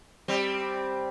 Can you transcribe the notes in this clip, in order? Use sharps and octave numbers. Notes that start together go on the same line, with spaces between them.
G3 C4